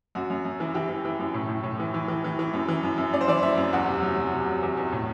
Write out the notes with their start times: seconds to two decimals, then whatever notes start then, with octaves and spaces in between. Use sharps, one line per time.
0.15 F#2 F#4
0.30 F#2
0.45 F#2
0.60 E3
0.74 E3 G4
0.89 E3
1.05 E3
1.19 F#2
1.34 A2
1.49 A2
1.64 A2
1.80 E3
1.94 E3
2.08 E3
2.24 E3
2.39 E3
2.54 F#2
2.68 E3
2.83 F#2
2.98 F#2
3.13 F#2 D5
3.21 C5
3.28 E3 D5
3.42 F#2 E5
3.58 F#2
3.73 E2 F#5
3.87 C3
4.02 F#3
4.17 F#3
4.33 C3
4.47 F#3
4.63 E2
4.77 E2
4.92 A2